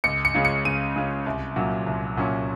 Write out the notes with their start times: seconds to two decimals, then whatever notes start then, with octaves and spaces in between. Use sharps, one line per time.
0.04 C#2 C#7
0.25 C#7
0.34 C#3 G#3 C#4 F4
0.45 C#7
0.65 C#2 D#7
0.96 C#3 G#3 C#4 F4
1.26 C2
1.56 A#2 F#3 C#4
1.86 C2
2.17 A#2 F#3 C#4